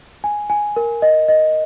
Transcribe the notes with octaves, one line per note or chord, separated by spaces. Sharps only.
G#5
G#5
A#4
D#5
D#5